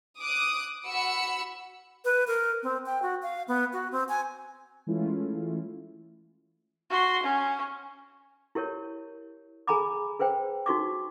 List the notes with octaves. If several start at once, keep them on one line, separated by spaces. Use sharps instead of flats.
D6 D#6 F#6
F#4 B5 E6 C#7
B4
A#4
C4
G5
F#4
F5
B3
F#4
C4
G#5
E3 G#3 A3 C#4 E4 F4
F#4 C6
C#4
E4 G4 A#4 C#5
G#4 G#5 A#5 B5 D6
G#4 B4 C5 G5
D#4 F#4 C#6 D6